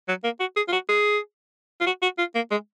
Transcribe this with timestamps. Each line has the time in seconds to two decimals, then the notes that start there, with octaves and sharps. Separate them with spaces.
0.08 F#3
0.24 A#3
0.40 F#4
0.56 G#4
0.68 F4
0.73 F#4
0.89 G#4
1.81 F4
1.86 F#4
2.02 F#4
2.18 F4
2.35 A#3
2.51 G#3